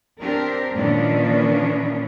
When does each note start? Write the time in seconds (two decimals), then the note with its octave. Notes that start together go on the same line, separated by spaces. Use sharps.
0.20 C4 D4 G4 A#4
0.74 A#2 D#3 E3 A#3 C#4 D4